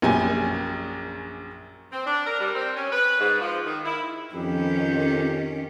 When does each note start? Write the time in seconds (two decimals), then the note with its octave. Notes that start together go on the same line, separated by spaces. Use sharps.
0.02 A#1 F#2 G4 G#5
1.92 C4
2.06 D4
2.26 A#4
2.40 G3
2.55 C4
2.75 C#4
2.92 B4
3.20 G#2
3.40 F3
3.66 D#3
3.85 E4
4.34 F2 D#3 C#4 G4